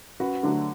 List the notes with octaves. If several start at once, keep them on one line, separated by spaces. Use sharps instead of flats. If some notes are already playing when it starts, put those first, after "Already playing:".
F#2 F#4 B4
D3 F#3 A3 D4